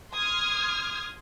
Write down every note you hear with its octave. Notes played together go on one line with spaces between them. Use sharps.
C6 D#6 F6 G#6